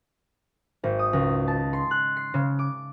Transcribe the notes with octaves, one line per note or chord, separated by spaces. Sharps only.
G#1
D#6
C#2
A5
C6
F#6
C7
C#3
D6